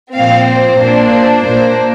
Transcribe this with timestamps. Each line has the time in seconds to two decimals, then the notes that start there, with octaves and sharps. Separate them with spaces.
0.14 A#2 F3 C4 F5
0.48 C5
0.81 A#2 A#3 D4
1.13 C5
1.46 A#2 A#3 D4 C5